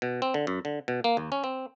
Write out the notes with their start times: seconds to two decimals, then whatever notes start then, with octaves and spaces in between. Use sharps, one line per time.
0.02 B2
0.22 C4
0.34 D3
0.47 F#2
0.65 D3
0.88 B2
1.04 A#3
1.17 D#2
1.32 C#4
1.44 C4